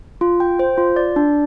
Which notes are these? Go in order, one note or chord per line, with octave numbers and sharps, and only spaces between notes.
F4
G5
C5
F4
D5
D4